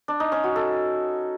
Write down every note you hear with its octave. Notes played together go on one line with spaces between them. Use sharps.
D4
D#4
C#4
F#4
A4